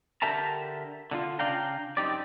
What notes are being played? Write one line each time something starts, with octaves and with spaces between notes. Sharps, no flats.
D3 G4 A#4 E5 A5 A#5
D3 D#4 F4
C#3 D4 D5 F5 G5 A#5
F#2 C4 D#4 G4 D5